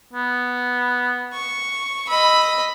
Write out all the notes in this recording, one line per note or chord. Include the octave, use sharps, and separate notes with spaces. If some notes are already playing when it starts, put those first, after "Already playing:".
B3
C#6
D#5 B5 E6